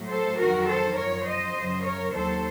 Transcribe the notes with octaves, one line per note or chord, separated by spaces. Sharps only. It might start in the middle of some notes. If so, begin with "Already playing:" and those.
Already playing: A2 F#3
A4 C5
F2 D#3 F#3 F#4 A#4
A4 C5
F#2 F3 A#4 C#5
C5 D#5
F#2 C#3 F#3
A#4 C#5
D#2 D#3 F#3 A4 C5